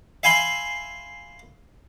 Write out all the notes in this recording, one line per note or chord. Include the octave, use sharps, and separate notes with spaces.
E5 F5 G#5 B5 C6